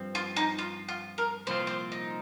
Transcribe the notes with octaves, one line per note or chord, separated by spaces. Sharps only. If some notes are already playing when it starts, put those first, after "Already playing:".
Already playing: G2 F3 C4
F4
D#4
F4
F4
A#4
C2 A#2 F3 C4 F4 C5
C5
D#4